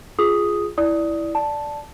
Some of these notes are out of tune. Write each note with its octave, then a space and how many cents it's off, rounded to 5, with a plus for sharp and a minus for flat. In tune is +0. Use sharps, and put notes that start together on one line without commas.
F4 +0 G#4 +0 D#6 +0
E4 +0 D5 +0 D#6 +15
D5 +0 A5 +0